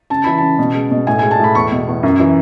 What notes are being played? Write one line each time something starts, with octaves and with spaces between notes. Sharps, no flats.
C#3 A5
E3 B5
C#3 A5
B2
G#3
B2
A2 G#5
G#3 G#5
A5
A2 B5
E2 C#6
B2
E2
F#2
E3